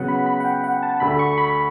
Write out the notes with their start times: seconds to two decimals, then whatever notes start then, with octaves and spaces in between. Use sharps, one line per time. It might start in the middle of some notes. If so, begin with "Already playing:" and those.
Already playing: C#3 F#3 B3 F#5
0.08 B5
0.26 B5
0.40 F#5
0.45 G5
0.64 F#5
0.83 A5
1.00 D2 D3 A3 B5
1.19 C#6
1.38 B5